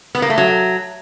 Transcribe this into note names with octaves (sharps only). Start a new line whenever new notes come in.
B3
A#3
A3
F#3